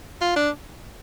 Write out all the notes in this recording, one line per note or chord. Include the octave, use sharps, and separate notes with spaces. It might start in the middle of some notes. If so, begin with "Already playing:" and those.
F4
D4